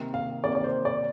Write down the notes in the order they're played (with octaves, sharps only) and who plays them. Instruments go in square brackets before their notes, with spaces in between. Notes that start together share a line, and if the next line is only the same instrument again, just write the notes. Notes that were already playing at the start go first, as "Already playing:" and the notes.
Already playing: [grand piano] C3 D#3 A#3
[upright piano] F5
[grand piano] C3 D#3 A#3 [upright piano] D5
[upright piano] D5
C5
D5